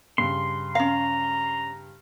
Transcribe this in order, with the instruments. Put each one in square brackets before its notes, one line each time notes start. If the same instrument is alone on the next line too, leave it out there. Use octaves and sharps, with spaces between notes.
[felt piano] G2 C#3 [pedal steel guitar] C6
[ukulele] C#4 F5 [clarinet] A#5